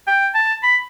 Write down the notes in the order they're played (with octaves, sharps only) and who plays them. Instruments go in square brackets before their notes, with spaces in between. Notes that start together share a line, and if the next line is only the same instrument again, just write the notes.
[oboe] G5
A5
B5